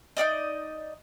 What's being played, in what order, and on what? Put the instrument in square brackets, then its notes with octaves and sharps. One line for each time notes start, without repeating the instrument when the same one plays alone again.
[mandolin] D#4 F4 D5 D#5